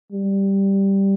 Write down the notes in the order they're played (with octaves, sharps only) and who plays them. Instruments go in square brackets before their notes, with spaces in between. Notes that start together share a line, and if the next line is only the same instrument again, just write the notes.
[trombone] G3